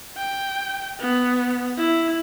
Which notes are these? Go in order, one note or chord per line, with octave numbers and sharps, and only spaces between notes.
G5
B3
E4